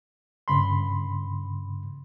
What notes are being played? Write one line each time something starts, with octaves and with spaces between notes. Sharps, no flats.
G2 C#3 B5 C6